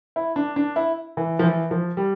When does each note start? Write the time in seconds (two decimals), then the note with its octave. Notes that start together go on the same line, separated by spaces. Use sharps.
0.16 E4
0.36 D4
0.56 D4
0.76 E4
1.17 E3
1.39 F3
1.43 E3
1.71 F3
1.97 G3